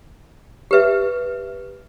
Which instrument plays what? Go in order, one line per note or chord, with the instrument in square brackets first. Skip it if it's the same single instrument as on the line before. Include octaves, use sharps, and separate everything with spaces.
[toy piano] G4 B4 E5